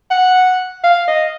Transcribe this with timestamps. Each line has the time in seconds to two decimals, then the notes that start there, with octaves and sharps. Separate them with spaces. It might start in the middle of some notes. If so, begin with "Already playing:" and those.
0.11 F#5
0.84 F5
1.08 D#5